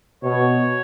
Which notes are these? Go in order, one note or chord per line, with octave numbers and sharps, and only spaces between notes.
B2 C#5